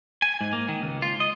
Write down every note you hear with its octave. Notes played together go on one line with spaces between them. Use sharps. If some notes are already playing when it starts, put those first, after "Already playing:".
G#5
G#2
A#3
D#3
C#2
F4
D#5